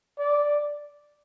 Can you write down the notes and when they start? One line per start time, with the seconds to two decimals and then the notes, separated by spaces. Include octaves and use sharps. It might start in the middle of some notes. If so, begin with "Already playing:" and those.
0.19 D5